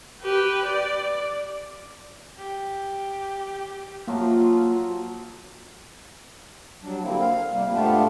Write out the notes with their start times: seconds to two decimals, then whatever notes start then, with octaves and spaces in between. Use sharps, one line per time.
0.22 G4 B4
0.65 D5
2.37 G4
4.08 F3 F#3 A#3 F4 F#4
6.83 F#3 G3 D4
7.02 D3 G3 A#3 C4 E4
7.20 F5
7.50 C3 G3 A#3
7.71 G#2 A3 B3 D4 F4 G4